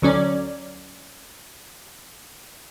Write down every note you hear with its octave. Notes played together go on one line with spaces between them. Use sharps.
D2 F#3 C#4 D5